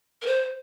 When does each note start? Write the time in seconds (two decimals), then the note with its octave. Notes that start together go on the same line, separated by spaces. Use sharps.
0.22 A#4
0.26 C5